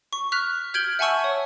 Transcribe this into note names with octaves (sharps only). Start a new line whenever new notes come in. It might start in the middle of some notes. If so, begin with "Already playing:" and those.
C#6
F6 F#6 B6 F7
F6 G6 G#6 D7 F#7 G7
E5 F#5 G#5 A5 C#6 E6
C#5